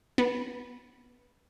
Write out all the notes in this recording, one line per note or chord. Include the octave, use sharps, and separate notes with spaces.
B3